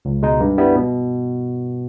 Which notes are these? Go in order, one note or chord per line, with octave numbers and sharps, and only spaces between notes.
C#2
B2 G#3 D#4
G2
G3 B3 E4
B2